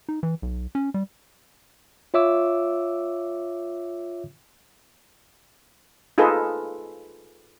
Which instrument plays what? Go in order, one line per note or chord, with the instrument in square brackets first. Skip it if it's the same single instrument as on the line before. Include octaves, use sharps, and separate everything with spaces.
[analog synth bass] D#4
E3
B1
C#4
G3
[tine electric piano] F4 C#5 E5 D6 E6
[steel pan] D#4 F4 G#4 A4 B4